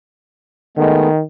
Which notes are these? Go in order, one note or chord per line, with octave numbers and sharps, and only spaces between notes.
D#3 G#3 A3 B3